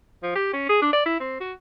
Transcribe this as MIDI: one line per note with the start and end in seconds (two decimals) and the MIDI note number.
0.23 0.35 53
0.35 0.50 67
0.53 0.69 61
0.69 0.82 68
0.82 0.92 62
0.93 1.03 74
1.05 1.19 64
1.20 1.37 60
1.40 1.54 66